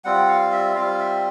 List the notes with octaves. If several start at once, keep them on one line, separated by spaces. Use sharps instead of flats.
G3 C4 F4 F#5
F5
E5
G3 C4 F4 F5
E5